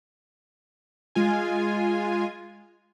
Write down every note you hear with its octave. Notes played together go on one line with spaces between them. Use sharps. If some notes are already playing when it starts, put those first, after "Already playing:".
G#3 F4 G#5